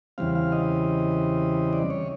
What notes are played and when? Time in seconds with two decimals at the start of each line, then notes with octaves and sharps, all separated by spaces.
0.18 E2 C#3 E3 G3 C4 F5
0.35 F5
0.52 D#5
1.73 D5
1.90 C#5